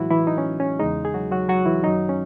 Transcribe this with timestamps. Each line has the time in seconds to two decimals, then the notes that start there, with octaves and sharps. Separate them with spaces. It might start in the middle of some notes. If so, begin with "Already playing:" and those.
Already playing: A2 E3 F#3 G#3 E4 F#4
0.11 E3 E4
0.27 D#4
0.38 C#4
0.60 C#4
0.79 E2 C#3 G#3 D#4
1.05 G#4
1.14 F#3 F#4
1.32 F#3 F#4
1.49 F#3 F#4
1.65 E3 E4
1.83 F#2 D#3 F#3 D#4
2.09 C#4